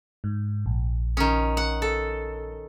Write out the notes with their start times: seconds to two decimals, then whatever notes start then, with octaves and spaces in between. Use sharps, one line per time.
0.24 G#2
0.66 A#1
1.17 D#3 C#4
1.57 F#5
1.82 A4